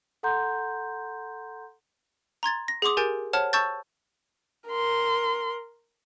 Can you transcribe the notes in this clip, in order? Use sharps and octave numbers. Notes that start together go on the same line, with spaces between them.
A4 F#5 A#5 C6 G6
A#5 C6 G#6 A6
A#6
G#4 F#5 C6 D6 D#6
G4 A#4 G#5 G6 A6 D7
C5 C#5 F#5 A5 F6
A5 C#6 E6 G6 A6
A#4 C6